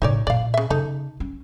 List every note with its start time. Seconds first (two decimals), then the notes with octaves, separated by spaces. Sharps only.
0.02 A2 C#3 D#4 C#5 D5
0.27 A#2 E4 D5 F5
0.54 C#3 E5
0.70 C#3 D#4 A4
1.20 C#4